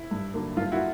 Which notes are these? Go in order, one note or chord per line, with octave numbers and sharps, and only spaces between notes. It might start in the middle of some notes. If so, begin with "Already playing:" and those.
Already playing: E4
G2
D3 F#3 A#3
G2 F4
E4 F#4